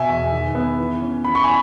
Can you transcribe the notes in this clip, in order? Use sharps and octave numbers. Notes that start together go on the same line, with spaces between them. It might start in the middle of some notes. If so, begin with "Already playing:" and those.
Already playing: B2 E5 G#5
E2
D#3
B3
E3
C#4
E3 B5
C#6
G#5 B5